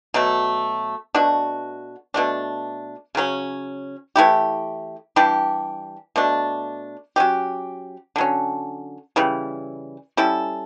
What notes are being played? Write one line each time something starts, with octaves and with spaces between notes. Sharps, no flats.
B2 F#3 A3
B2 A3 D4 F#4
B2 A3 D4
C#3 F#3 C#4
E3 A3 E4 G4
E3 G3 D4 G4
B2 A3 D4
F#3 C#4 G4
D3 F#3 C#4
C#3 E3 G3
G3 C#4 E4 A4